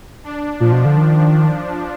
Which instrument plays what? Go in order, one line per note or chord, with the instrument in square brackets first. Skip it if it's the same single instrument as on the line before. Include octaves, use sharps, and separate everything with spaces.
[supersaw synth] D4
[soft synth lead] A#2 [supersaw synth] F3
[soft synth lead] B2
D3
D#3